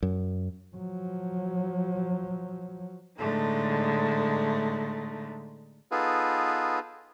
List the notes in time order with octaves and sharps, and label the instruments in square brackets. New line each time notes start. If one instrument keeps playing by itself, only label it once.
[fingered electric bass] F#2
[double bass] F3 F#3
[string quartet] A2 D3 G#3 A3 D#4
[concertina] B3 D#4 F4 G#4 A4 B4